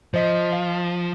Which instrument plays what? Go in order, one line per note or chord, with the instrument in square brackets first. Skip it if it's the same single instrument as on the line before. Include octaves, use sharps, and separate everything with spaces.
[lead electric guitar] F3 [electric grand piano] C5 D#5 B6
[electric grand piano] F5